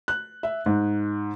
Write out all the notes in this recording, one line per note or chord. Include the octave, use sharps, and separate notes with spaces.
F#6
E5
G#2